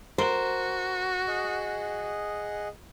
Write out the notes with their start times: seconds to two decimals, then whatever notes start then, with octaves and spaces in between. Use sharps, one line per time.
0.18 F#4 A#4 C5
1.27 G#4 D#5 F#5